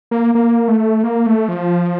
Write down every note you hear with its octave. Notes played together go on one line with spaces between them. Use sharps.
A#3
A#3
A3
A#3
A3
F3